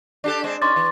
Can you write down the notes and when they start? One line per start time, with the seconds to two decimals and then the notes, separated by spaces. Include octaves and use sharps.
0.24 D4 G4 A4
0.44 G#3 C4 D4
0.62 C#4 D#4 C6 D6 A6
0.76 E3